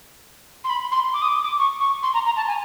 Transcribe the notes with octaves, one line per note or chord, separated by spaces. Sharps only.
C6
B5
C6
D6
D#6
D6
D6
C#6
C#6
C6
A#5
A#5
A5
G#5